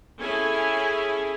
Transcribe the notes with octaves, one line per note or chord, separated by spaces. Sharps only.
C#4 E4 G#4 A4 G#5